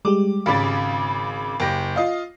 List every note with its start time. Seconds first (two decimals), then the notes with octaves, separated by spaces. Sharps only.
0.05 G3 G#3 G4 D6
0.46 G#1 C#3 F5 B5 D6 A6
1.60 F#1 G4 A#6
1.96 F4 D#5 F5